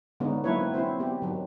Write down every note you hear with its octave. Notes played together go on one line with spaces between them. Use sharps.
D3 G#3 B3 C#4 D#4
F#3 A#3 E4 B4 C#5
C4
C4 C#4 E4 C5
B3 G4
D#3 F#3